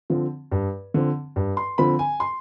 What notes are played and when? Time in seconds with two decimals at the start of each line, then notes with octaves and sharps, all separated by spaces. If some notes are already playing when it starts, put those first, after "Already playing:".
0.10 D3 F3 C4
0.51 G2
0.94 D3 F3 C4
1.36 G2
1.57 C6
1.78 D3 F3 C4 B5
1.99 G#5
2.20 C6